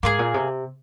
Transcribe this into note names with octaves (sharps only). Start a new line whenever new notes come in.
G#2 A#3 F4 G#4
A#2
C3